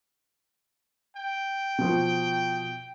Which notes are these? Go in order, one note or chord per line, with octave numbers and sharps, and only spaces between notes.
G5
B2 F3